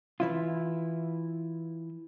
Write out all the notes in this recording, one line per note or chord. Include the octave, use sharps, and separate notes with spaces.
E3 E4 F4